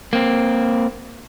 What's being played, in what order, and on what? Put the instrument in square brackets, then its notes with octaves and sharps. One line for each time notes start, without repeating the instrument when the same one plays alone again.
[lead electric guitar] A#3 C4